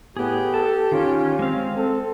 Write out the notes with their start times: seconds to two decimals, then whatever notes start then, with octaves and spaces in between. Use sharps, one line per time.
0.17 A2 B3 G4 G#4
0.54 A4 A5
0.92 D#3 C#4 F4
1.39 G#3 C4 F5
1.76 C4 A4